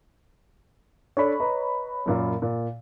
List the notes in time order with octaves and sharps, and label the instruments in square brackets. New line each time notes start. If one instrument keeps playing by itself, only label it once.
[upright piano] D4 A4 D5 [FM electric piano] C#5 B5
[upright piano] B4 D#5 A#5
F#2 A#2 A#3
A#2